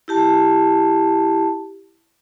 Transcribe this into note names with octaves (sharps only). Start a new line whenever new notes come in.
E4 G4 A5